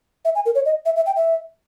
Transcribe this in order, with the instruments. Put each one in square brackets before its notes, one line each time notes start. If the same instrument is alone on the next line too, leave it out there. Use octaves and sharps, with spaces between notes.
[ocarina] E5
G#5
A#4
C#5
D#5
E5
E5
G5
E5